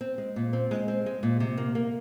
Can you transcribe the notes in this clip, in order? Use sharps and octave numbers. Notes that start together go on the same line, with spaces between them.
C4
G#3
A#2
C4
G#3
C4
G#3
A#2
C3
A#3
A#3